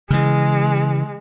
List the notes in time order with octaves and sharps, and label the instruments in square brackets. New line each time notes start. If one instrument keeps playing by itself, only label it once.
[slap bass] C#3 E3 [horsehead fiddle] G#3